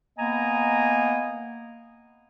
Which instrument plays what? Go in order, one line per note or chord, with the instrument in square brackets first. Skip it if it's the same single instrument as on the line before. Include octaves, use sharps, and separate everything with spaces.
[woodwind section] A#3 B3 D#5 G#5 A#5